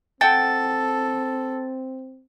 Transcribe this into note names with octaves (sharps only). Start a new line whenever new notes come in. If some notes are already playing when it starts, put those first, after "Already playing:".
C4 A4 F#5 G5 A5 A6